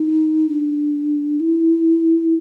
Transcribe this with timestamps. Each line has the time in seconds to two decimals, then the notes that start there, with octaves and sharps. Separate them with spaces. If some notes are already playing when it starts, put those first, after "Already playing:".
Already playing: D#4
0.49 D4
1.40 E4